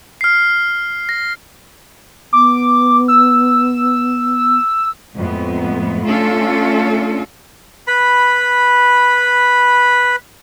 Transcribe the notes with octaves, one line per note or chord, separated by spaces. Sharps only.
F6 C7
A#6
B3 D6
E6
F2 A2 G#3 B3
A3 C#4 D4 F4 A4
B4 B5